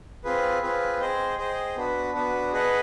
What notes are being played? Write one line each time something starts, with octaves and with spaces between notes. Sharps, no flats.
C4 F4 G#4 B4
C4 F4 G#4 B4
G#4 C5 D#5 G5
G#4 C5 D#5 G5
B3 D4 F#4 B4
B3 D4 F#4 B4
G#4 B4 D#5 F#5